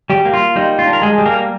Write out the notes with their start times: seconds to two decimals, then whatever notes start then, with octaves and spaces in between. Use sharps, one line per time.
0.10 G3 G4
0.25 A#3
0.34 F4
0.56 G3 D#4
0.79 F4
0.86 D4
0.93 A#4
1.02 G#3 G#4
1.18 G3
1.25 A#3 A#4